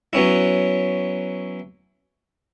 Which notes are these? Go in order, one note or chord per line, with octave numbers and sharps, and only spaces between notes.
F#3 B3 C#4 E4